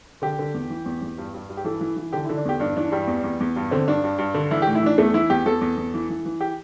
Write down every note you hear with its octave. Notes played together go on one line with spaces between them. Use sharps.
D3 G4
D3
E2
E3
E2
E2
G2
G2
G2
G4
E3 A4
E3
E3
D3 G4
E4
D3
D4
E2 G4
G2 D4
E3 D4
G2 G3
E2
E2
E2
G2
D3 C4
G2 D4
G2
G2
D3
E3 E4
G4
A2
E4
E3 D4
E2 A3
E3 E4
E2 G4
E2 A4
E2
E2
E3
E3
E3
G4